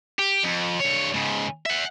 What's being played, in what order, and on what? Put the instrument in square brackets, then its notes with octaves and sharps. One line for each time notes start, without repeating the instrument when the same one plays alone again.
[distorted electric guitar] G4
F2
G2 C#5
G#2 C#3
E5 F#5